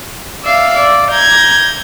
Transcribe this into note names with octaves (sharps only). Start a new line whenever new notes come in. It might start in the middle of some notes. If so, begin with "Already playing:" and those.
D5 E5 F5
D5
A#5 G6 G#6 A#6